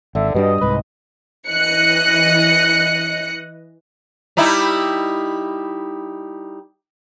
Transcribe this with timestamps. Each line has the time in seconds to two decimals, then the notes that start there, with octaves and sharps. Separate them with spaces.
0.15 G#1 D3 E5
0.34 G2 B2 G3 D4 D#5
0.61 C2 G#2 B4
1.49 E3 D#5 F#6 C#7
4.37 G3 D#4 E4